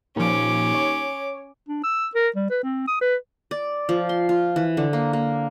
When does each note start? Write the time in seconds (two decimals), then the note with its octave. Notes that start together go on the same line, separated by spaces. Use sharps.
0.16 D#2 A#2 F3 C#4 D6
0.74 C#5
1.68 D4
1.83 E6
2.15 A#4
2.36 G3
2.50 B4
2.63 C4
2.87 D#6
3.01 B4
3.51 D5
3.89 F3
4.09 C6
4.29 F4
4.56 E3
4.77 D3
4.93 A#3
5.13 A#3